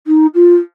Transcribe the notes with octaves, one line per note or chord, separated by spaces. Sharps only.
D#4
F4